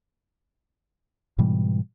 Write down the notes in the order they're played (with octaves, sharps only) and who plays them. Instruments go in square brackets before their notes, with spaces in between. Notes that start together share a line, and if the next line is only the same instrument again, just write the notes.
[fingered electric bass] G#2 B2 E3 G3